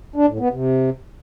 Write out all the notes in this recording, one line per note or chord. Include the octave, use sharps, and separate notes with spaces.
D4
A2
B3
C3